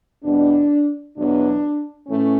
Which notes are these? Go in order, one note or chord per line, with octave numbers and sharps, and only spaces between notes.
E2 B2 G3 D4
E2 B2 F#3 B3 D4
A2 E3 A3 C#4